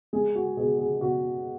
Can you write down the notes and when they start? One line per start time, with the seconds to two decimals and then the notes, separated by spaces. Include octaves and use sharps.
0.13 G#3 G#4
0.35 F#4
0.57 B2 G#4
0.79 G#4
1.01 B2 F#4